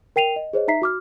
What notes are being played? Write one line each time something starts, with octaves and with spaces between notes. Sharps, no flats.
A#4 G5 C7 D#7 F7
D#5
G#4 C5 C#5 D#5
D#4 E5 A#5 B6 C7
F#4 D6 F6